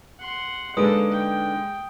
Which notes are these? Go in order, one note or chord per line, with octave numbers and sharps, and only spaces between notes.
F#5 C6
D3 G#3 A#3 D#4 A4 B4 D#6 D7
G5